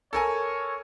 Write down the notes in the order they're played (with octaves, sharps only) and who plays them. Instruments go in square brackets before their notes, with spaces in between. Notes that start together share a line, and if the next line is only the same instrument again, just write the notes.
[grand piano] A4 A#4 G#5 [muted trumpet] C#5